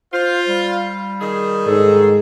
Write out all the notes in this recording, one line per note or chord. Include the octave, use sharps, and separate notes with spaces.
F4 C5
G3
D#3 G#4
G#2 A4